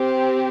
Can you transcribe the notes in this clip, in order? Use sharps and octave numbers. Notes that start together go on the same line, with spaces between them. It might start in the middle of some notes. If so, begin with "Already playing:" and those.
Already playing: C4 G4